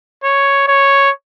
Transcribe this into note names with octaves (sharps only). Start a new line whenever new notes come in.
C#5
C#5